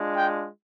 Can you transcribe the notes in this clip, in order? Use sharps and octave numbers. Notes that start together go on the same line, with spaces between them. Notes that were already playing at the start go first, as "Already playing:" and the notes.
Already playing: G#3 D4 F4
G5